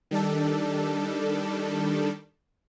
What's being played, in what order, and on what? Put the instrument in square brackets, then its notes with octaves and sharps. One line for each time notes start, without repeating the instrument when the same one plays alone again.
[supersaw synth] D#3 G3 D4 A4